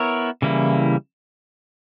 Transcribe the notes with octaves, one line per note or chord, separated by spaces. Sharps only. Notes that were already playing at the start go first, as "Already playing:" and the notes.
Already playing: B3 E4 A#4 C#5
C#3 E3 G3 A#3 E4